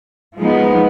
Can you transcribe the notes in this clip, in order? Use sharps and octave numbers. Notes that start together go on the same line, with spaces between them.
F3 G#3 B3 D#4